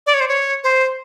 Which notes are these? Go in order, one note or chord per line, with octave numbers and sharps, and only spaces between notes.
D5
C#5
C5
C#5
C5